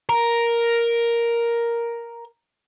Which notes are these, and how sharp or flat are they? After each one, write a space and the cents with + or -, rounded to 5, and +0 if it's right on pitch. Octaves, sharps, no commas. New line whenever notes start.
A#4 +5